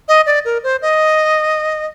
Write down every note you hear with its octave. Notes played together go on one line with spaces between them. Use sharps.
D#5
D5
A#4
C5
D#5